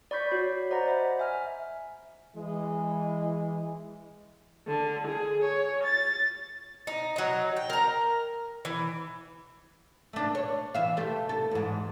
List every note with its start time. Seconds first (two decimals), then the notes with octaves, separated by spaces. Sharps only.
0.11 D5 B5 C#6 G6 B6
0.31 F#4 C#5 G6
0.70 C5 D5 D#5 F#5 A#5 B5
0.88 E5
1.19 E5 G#5 F6
2.35 E3 G#3
4.68 D3
5.07 G#4
5.44 C#5
5.84 A6
6.87 D#4
7.16 F#3 D#4
7.57 G5
7.70 A#4 A#5
8.65 E3
10.13 A3 D4
10.35 C#5
10.74 E3 E5 F5
10.97 C3 A3 G4
11.29 A4
11.51 E2 G#2